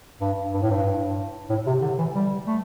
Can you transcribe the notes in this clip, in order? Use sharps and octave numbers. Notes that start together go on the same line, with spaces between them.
G2
G2
A2
G2
A2
C3
D3
E3
G3
A3